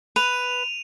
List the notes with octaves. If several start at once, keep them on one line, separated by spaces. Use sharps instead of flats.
B4 D#7 F7